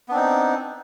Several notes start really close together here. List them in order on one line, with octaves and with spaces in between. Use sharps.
B3 D4 C4 D#4